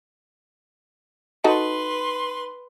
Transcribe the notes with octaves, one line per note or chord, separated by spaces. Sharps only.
D#4 F#4 A4 B4 C6